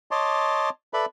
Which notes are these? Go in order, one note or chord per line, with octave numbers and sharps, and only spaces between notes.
C#5 D#5 A5 C6 D6
A4 B4 D5 E5 B5